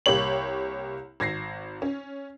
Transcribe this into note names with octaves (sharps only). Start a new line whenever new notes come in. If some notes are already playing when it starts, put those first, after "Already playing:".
C2 A#3 G4 C#5 F#7
G#1 G#6 A#6 C7
C#4